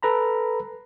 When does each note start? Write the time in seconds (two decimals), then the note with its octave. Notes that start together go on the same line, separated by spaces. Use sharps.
0.03 A4 B4 A#5 B5